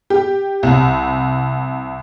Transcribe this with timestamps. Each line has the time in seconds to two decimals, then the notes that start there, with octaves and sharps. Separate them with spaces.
0.10 G4
0.63 C2